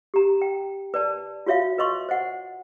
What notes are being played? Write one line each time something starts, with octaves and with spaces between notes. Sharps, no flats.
G4 A#5
G5
B4 D5 A5
F4 F#4 C#5 E5 F5
B4 D#5 C6 C#6
C5 D#5 F#5